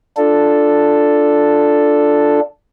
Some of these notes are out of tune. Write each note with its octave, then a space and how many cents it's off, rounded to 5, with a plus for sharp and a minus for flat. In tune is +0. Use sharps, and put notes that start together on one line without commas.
D4 +0 F4 -5 A4 +0